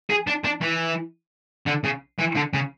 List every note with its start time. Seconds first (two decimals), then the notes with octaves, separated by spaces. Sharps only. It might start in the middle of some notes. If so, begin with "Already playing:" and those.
0.10 G#4
0.27 D4
0.44 D4
0.62 E3
1.66 D3
1.84 C#3
2.19 E3
2.36 D3
2.54 C#3